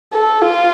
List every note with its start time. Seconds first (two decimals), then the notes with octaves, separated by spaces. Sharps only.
0.13 A4
0.42 F4